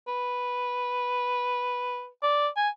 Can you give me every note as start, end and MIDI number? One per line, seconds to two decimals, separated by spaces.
0.08 2.07 71
2.23 2.48 74
2.57 2.69 80